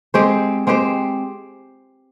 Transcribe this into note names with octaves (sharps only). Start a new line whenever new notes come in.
G#3 C4 G4 C5
G#3 C4 G4 C5